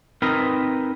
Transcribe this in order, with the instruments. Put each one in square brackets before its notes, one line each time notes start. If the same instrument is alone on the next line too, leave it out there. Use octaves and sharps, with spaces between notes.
[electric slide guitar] C4 D#4 A#4 B4